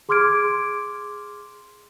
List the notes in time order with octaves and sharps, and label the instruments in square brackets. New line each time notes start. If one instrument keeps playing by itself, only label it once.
[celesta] G#4 C6 D6 F6 G#6 D7